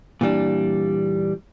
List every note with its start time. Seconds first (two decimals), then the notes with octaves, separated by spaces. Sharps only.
0.21 A#2 E3 G3 D4